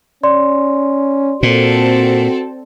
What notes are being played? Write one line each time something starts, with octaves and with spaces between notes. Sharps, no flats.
C#4 D5 C6
A#2 C4 F#4 A4